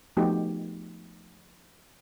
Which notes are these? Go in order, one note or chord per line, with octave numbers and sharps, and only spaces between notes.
F3 A3 B3 D#4 F#4 G4